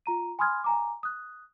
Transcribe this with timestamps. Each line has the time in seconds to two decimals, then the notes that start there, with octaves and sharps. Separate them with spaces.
0.06 F4 A#5 D#7
0.39 G#5 B5 C6 D#6 F6 G#6
0.64 G#5 A#5 D6
1.03 D#6 F#6